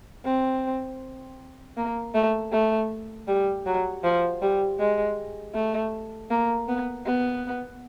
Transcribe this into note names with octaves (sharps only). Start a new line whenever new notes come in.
C4
A#3
A3
A3
G3
F#3
F3
G3
G#3
A3
A#3
B3
B3